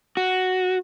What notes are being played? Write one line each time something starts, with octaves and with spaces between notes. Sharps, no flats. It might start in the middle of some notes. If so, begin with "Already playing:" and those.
F#4